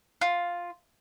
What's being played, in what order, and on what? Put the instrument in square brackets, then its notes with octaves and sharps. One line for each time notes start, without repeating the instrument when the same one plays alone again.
[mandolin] F4